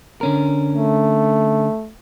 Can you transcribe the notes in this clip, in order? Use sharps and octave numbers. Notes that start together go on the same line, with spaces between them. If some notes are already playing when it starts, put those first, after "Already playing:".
D3 C#4 A#4
A3